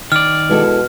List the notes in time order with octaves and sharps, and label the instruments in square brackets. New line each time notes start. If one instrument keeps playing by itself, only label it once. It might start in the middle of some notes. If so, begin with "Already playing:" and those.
[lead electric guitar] D#3 D5 [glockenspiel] F6
[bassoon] B2 [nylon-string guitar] G#3 E4 A4